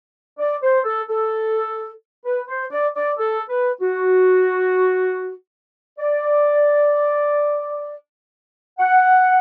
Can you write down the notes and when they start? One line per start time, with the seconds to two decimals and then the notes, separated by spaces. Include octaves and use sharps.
0.39 D5
0.62 C5
0.85 A4
1.08 A4
2.24 B4
2.48 C5
2.71 D5
2.95 D5
3.18 A4
3.49 B4
3.81 F#4
5.98 D5
8.79 F#5